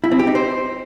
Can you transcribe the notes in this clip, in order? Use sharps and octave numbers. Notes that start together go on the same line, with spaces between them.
E4
C4
G4
D#4
C5